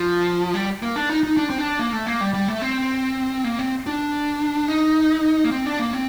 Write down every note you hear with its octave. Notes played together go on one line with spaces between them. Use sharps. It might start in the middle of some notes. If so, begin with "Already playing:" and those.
Already playing: F3
G3
A#3
D4
D#4
D#4
D4
C4
D4
A#3
A3
A#3
G3
G3
A3
C4
A#3
C4
D4
D#4
A#3
C4
D4
A#3
C4